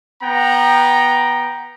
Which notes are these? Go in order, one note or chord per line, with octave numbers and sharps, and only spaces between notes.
B3 G5 A#5